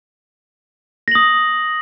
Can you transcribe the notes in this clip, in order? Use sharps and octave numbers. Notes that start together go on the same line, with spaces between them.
D#6 A#6 F#7